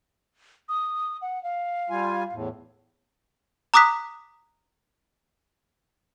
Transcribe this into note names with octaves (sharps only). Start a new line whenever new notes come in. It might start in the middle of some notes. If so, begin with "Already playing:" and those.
D#6
F#5
F5
G3 F4 G#5
E2 A2
A#5 D6 D#6 F#6 B6